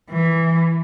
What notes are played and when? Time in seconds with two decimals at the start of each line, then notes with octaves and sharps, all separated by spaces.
0.10 E3